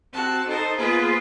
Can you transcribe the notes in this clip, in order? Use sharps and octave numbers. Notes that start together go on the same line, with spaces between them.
C4 F#4 A5
D#4 A4 A#4 C5
A#3 B3 F4 G#4 B4 C5